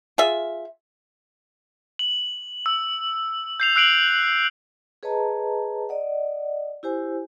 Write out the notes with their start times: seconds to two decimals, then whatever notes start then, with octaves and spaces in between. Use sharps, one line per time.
0.18 F4 G#4 E5
1.99 F#7
2.66 E6
3.60 G6 C7 F7
3.76 E6 F#6 C7 D7 F7 F#7
5.03 G#4 B4 C#5 D#5 A5 A#5
5.89 D5 D#5 F#5
6.83 E4 G4 C5 G#5